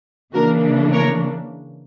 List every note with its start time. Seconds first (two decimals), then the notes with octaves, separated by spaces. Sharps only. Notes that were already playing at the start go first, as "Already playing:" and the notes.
0.34 C#3 E3 A#3 D4 F#4 A#4
0.92 A#4 C#5